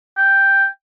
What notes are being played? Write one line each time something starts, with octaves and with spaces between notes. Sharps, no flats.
G5